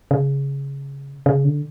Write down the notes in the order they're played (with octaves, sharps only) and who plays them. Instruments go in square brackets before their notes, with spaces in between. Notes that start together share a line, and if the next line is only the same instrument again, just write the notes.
[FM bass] C#3
C#3
D3